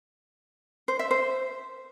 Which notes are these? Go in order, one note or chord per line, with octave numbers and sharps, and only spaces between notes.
C5
E5
C5